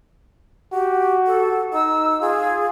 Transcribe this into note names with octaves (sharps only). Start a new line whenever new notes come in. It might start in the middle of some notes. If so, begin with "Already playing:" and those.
F#4 G4
A4
D#4 E6
F4 G#4